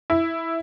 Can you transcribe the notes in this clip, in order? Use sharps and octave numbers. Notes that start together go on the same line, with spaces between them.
E4